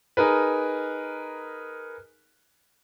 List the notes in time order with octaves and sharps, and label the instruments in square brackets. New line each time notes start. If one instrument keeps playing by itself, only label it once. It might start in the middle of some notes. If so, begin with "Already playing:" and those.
[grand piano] D#4 G#4 A#4 B4